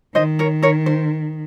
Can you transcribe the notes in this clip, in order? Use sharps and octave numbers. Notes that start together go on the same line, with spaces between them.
D#3 C5 D#5
A#4 C#5
A#4 C#5
C5